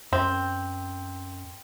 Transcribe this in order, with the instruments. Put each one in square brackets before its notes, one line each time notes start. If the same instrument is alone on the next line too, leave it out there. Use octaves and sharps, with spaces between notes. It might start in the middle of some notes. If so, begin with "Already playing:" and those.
[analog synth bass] F#2 [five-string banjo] C4